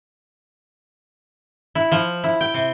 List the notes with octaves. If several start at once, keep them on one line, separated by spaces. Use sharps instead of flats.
E4
F3
E4
G5
C3